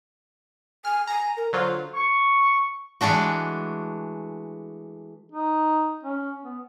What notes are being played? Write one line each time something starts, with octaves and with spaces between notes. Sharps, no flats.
G#5 F6
G#5 A#5
A#4
D3 F#3 F4 C5
C#6
E3 G#3 A3 D4 F#4
D#4
C#4
B3